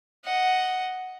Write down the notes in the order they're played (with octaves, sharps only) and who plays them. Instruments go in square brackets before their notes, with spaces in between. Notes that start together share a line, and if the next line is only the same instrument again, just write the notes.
[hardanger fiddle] D#5 F#5